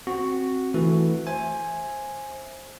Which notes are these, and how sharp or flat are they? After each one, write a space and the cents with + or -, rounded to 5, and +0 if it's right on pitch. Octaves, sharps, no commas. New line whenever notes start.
C4 +15 F#4 +0
E3 +0 A3 +0 F#4 +0
C5 +20 E5 +0 G#5 +0